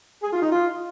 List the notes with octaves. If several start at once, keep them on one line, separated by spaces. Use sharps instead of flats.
G#4
F4
D#4
F4